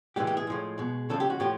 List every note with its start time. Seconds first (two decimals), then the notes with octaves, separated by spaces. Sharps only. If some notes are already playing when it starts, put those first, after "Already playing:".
0.16 A2 E3 G#3 G4
0.27 G4
0.37 G#4
0.47 A2 F3 G#3
0.78 B2 G#3
1.09 C#3 F3 G#3 A4
1.20 G4
1.30 F#4
1.40 A2 F3 G4